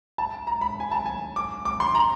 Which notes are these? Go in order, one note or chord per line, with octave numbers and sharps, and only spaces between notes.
A5
A#5
B5
G#5
A5
G#5
D6
D6
C6
A#5